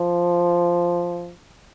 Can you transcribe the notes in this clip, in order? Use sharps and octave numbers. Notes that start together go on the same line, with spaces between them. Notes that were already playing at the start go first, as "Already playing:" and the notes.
Already playing: F3